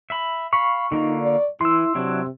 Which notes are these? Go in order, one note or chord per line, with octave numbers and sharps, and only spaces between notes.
E5 B5
F5 B5 C#6
D3 A#3 D#4 F4
D5
E3 E4 C6 E6
C3 F#3 D4 E4